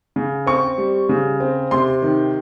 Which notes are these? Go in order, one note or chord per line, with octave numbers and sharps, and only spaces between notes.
C#3
C4 C#6
G3
C#3
C4
C3 C6
D#3